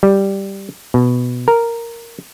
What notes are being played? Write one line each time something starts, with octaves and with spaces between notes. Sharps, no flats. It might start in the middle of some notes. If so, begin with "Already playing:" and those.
G3
B2
A#4